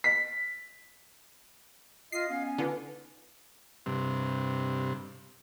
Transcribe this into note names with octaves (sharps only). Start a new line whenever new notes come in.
B6
F4 D#5 C7
B3 C#4 F5
G#5
D3 D#4 F4 B4
G2 C3